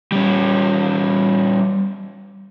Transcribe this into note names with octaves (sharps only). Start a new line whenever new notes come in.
G3 C#4